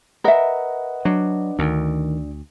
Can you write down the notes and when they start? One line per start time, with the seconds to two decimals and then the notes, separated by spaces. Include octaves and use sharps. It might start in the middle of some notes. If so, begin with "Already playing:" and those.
0.24 A#4 B4 D#5 E5 F#5
1.05 F#3 D4
1.59 D2 D#3